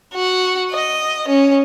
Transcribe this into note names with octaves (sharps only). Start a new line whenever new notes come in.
F#4
D#5
C#4